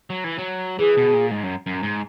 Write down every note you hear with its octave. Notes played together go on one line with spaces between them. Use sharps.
F#3
E3
F#3
E3 G#4
B2
A#2
G#2
F#2
F#2
G#2